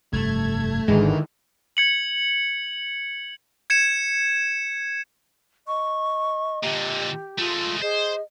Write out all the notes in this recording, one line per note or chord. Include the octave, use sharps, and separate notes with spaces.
F1 G2 A3 G#6
G#1 G#2 D3 D#3 G#3 E4 B4
G#6 C#7 F#7
G#6 C#7 E7
D#5 C#6
A#2 D3 G4
G#3 A3 F4
G#4 C5 D#5